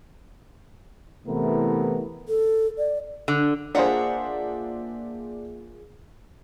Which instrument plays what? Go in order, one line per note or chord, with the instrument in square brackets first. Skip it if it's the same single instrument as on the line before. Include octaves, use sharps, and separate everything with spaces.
[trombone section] C3 E3 A3 B3 E4 A#4
[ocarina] A4
D5
[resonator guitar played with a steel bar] D3
[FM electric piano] A#3 F4 G#4 [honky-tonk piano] D4 C5 [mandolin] E5 F#5 A#5